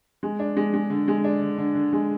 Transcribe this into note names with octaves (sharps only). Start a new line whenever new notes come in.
G#3
D4
G#3
G#3
D3
G#3
D4
D3
D3
D3
G#3